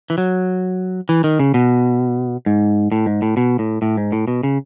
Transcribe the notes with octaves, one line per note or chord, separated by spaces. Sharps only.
E3
F#3
E3
D#3
C#3
B2
G#2
A2
G#2
A2
B2
A2
A2
G#2
A2
B2
C#3